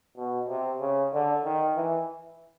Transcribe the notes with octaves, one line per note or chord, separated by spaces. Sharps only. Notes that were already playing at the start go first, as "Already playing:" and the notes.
B2
C3
C#3
D3
D#3
E3